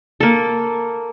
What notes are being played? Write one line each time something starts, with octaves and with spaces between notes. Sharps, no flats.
A#3 A4